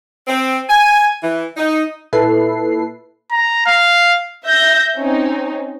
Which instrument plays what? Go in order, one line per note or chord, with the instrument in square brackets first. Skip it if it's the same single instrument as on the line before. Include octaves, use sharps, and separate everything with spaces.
[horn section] C4
G#5
E3
D#4
[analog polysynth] A#2 E4 A4 B4 C7
[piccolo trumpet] A#5
F5
[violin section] E5 G6 A#6
C4 C#4 D#4